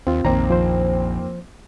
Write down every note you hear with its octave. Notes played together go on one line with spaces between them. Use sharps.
D#2 C4 F4
A#1 F2 D#3 A#3 C4 A#5
F3 C5